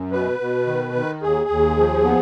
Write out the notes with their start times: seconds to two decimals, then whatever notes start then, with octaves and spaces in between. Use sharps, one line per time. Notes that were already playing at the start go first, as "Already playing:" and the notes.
Already playing: F#2
0.11 B2 B4
0.40 B2
0.67 D#3
0.95 D#3
1.22 D#2 G#4
1.50 D#2
1.78 F3
2.04 B3